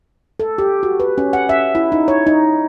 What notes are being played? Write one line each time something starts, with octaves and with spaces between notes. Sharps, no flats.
A4
G4
F#4
B4
C#4
F#5
E5
E4
D#4
C#5
D#4